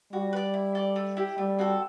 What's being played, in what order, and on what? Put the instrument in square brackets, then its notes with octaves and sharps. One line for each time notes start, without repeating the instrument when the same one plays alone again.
[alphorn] G3 [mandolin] F#4
[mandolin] B4
D5
E4
A4 D5
A3
E4 G4
[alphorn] G3 [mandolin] A3
[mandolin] C4 F#4 A4